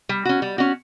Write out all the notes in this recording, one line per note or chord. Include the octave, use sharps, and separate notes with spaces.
G3
C#4 F#4
G3
C#4 F#4